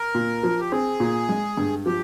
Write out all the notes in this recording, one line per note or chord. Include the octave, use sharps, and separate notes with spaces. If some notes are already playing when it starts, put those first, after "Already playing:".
Already playing: A#4
A#2
F3
G4
C4 G#4
A#2
G#3
G2
F3 G4